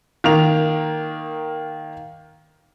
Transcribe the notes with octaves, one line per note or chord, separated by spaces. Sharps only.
D#3 A#3 F7